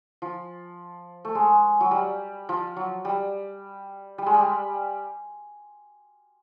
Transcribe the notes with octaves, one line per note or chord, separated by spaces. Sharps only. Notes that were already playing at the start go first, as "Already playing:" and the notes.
F3
A3
G#3
F#3
G3
F3
F#3
G3
G3
G#3
G3